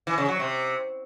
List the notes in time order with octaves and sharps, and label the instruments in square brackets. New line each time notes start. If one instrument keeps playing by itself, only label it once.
[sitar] E3
C#3
F#3
C3